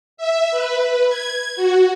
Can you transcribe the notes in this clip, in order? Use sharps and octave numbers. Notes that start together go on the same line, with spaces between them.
E5
B4
G#6
F#4